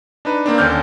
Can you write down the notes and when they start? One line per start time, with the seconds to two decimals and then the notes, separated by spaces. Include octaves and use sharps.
0.25 D4 D#4 B4
0.46 A#3 C4 D4
0.58 D#2 D3 C#4 F6 G6